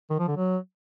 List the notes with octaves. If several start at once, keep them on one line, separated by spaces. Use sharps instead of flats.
D#3
F3
D3
F#3